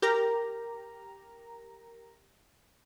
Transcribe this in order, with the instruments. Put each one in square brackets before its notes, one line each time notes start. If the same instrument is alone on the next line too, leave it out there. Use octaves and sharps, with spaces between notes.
[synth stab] G4 A#4 A#5